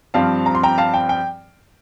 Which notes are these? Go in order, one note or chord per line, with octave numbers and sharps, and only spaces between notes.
G2 F3 C4 F5 A5
A#5
C6
G5 A#5
F5 A5
G5
G5